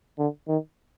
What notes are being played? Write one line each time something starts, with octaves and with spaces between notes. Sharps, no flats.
D3
D#3